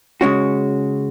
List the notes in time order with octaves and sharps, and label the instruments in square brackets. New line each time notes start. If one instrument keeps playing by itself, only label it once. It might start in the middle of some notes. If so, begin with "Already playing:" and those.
[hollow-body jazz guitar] C#3 G#3 C#4 F#4